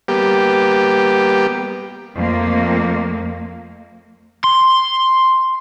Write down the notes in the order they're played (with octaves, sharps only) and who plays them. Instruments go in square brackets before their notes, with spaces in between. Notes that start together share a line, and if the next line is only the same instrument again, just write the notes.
[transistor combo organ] G3 A#3 B3 G4 D6
[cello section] F2 A3 A#3
[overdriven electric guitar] C6